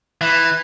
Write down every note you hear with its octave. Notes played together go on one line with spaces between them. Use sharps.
E3